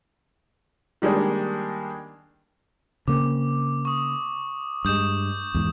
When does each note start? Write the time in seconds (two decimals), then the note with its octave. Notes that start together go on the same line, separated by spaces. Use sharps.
1.02 D#3 G3 G#3 A#3 D4
3.08 C#3 A#3 C4 D6
3.85 C#6 D#6
4.85 G2 G#3 D#6 G6 E7
5.54 E2 G#2